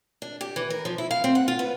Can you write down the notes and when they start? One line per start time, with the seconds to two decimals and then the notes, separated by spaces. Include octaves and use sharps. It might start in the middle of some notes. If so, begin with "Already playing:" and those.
0.22 D4
0.41 G4
0.56 E3
0.70 A#4
0.85 F3
0.98 E4
1.11 F5
1.24 C4
1.35 F#5
1.48 F4
1.59 B3